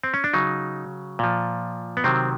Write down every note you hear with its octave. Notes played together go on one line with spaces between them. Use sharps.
C4
C#4
D4
C#3 F#3 D#4
A#2 F3
B3
C3 D#3 F#3 C4